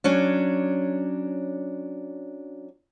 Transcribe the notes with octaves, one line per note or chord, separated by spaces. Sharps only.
F#3 C#4 D4